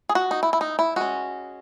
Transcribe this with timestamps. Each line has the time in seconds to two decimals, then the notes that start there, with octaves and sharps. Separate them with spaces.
0.09 G#4
0.15 F#4
0.31 D#4
0.43 E4
0.53 E4
0.61 D#4
0.79 E4
0.96 G#3 C#4 F#4